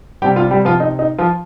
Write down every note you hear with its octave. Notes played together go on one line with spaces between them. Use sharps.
C3 G3 G4 G5
F4 F5
G3 G4
F3 F4
D#4
D#4
F3 F4